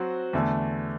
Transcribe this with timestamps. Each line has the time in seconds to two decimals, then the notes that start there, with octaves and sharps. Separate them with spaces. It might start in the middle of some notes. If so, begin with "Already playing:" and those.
Already playing: F#3 C4 F#4 C5
0.33 E2 D3 A3